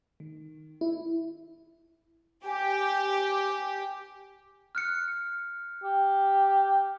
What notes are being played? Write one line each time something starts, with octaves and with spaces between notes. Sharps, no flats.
D#3
E4
G4 G#5
F6 F#6 C#7
G4